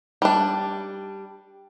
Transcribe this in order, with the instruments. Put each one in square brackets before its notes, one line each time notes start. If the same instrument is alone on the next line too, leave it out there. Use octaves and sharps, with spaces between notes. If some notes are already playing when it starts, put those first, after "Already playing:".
[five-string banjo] G3 D4